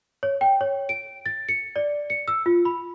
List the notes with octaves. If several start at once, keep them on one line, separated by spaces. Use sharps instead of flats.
C#5
G5
C#5
D7
A6
C#7
D5
C#7
E6
F4
B5